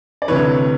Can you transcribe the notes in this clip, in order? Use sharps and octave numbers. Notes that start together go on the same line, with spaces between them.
D5
D2 C3 E3 B4 C#5